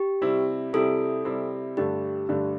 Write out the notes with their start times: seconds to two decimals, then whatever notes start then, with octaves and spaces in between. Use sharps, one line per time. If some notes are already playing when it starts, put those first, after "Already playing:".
Already playing: G4
0.22 C3 G3 C4 E4
0.73 C3 G3 C4 E4 A4
1.25 C3 G3 C4 E4
1.77 G2 D3 A3 D4 G4
2.29 G2 D3 A3 D4